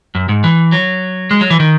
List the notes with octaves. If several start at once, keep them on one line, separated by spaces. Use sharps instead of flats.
F#2
G#2
E3
F#3
G#3
F#3
E3
D#3